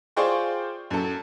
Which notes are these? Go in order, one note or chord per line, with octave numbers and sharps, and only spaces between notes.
F4 G#4 C5 D5 G5 C#6
F#2 A4